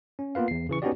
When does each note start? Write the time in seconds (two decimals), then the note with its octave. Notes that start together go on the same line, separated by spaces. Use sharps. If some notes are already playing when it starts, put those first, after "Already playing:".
0.19 C#4
0.35 A#3 B3 F4 B4 F5
0.48 E2 C7
0.69 C#3 E3 C#6
0.82 B3 C#4 D#4 F#4 G4 D5